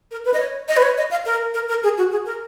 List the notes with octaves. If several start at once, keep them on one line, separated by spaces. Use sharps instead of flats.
A#4
B4
D#5
C#5
D#5
B4
C#5
D#5
F5
A#4
A#4
A#4
G#4
F#4
G#4
A#4